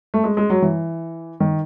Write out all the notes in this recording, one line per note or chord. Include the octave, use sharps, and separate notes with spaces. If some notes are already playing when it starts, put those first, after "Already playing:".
A3
G#3
G#3
F#3
E3
D#3